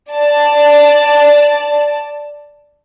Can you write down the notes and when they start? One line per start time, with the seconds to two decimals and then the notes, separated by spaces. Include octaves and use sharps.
0.11 D5 A5